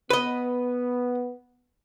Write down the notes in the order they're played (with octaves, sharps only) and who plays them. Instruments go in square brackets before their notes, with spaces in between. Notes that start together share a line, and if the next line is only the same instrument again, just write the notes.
[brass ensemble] B3 [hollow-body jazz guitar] B4 D#5